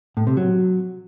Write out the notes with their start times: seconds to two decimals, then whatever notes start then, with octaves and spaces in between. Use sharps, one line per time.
0.17 A2
0.27 C3
0.37 F#3